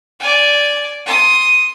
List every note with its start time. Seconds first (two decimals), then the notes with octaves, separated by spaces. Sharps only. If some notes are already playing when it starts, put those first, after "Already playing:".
0.20 D5 G#5
1.06 C6 D#6